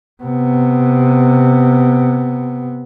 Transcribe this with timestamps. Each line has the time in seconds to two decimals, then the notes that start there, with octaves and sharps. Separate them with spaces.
0.23 C3 B3